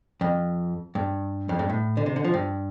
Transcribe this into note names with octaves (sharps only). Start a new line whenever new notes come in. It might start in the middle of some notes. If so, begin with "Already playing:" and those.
F2
G2
F2
G2
A2
D3
C3
D3
F3
G2